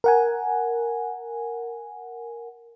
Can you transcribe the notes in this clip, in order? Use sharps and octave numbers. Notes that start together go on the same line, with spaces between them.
A#4 F#5 G#5